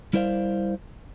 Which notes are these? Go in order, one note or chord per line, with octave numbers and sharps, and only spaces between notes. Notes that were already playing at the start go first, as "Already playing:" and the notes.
G3 E4 A#4 C5 D5 F5